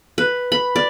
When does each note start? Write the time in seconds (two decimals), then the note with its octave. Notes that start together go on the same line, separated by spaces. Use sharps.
0.18 B4
0.52 B5
0.76 D5